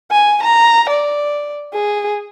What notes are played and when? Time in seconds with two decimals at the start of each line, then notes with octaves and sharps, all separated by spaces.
0.11 G#5
0.43 A#5
0.90 D5
1.74 G#4